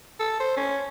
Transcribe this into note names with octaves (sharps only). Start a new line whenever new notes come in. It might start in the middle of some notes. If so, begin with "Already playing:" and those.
A4
C5
C#4